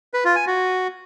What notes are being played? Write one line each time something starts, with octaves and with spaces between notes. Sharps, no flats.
B4
F4
G#5
F#4